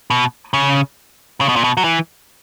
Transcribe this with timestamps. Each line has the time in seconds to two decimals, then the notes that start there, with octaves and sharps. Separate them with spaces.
0.10 B2
0.53 C#3
1.41 C#3
1.49 B2
1.56 A#2
1.64 B2
1.77 F#3
1.84 E3